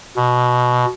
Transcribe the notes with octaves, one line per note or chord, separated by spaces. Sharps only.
B2